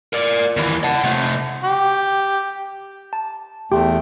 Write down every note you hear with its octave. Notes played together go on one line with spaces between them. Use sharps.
A#4 D5
D#2 E3
F#5 A5
C3 A3
G4
A5
E2 A3 G4 G5 C6